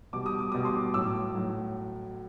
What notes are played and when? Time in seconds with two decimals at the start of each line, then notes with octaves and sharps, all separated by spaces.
0.13 B2 G3 D6
0.26 D#6
0.39 D6
0.52 B2 G3 D#6
0.65 C6 D6
0.94 A2 F#3 D6 E6
1.35 A2 F#3